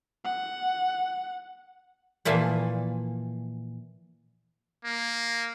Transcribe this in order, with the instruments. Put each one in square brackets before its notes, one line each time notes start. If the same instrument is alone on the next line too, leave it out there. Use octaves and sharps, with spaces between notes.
[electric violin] F#5
[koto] A#2 E3 F3 A#3
[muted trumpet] A#3